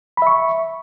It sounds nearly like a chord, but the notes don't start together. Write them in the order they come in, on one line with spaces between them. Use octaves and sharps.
B5 E5 C#6